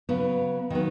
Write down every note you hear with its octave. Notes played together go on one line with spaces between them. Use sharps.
C#3 F#3 B3
D#3 F#3 B3